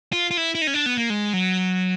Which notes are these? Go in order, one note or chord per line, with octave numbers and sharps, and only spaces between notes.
F4
F4
E4
E4
D#4
C#4
D4
B3
A#3
G#3
F#3